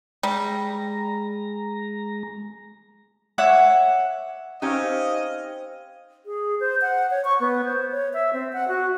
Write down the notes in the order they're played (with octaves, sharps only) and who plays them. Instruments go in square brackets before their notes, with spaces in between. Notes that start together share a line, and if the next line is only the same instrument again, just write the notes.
[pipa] G3 [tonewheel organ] G#3 A#5
[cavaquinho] C#5 E5 F#5 D6
[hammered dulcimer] C4 F5 [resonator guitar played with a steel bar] C#4 D#4 G4 [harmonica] D#5
[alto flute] G#4
C5
F#5
C#5
C#6
B3
C5
C#5
E5
C4
F#5
F#4